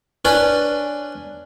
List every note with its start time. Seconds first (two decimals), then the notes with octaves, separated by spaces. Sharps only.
0.25 C#4 D4 B4 C#5 D5